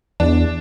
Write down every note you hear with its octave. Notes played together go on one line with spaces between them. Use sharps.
E2 D4